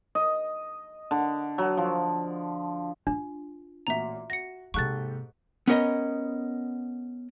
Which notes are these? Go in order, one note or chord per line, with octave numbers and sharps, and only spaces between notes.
D#5
D3
F#3
F3
D4 F4
A1 A#2 F#4 E5 A#5
F#4 A#6 C#7
G#2 C3 A#3 G4 A4 C#6 F#6 A6
B3 C#4 A#4 D#5